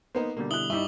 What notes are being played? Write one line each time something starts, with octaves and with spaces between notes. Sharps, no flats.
A#3 B3 D#4 C5
B2 D3 G3 A#3
E4 D#6 F#6 F#7 G7
G2 G3 D#4 E4 E5 C#6 D6